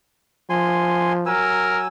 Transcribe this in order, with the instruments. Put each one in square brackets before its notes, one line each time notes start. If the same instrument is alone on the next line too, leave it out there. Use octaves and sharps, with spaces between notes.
[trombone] F3 [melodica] G#5 C6
[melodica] F#3 G#5 E6 [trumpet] A#4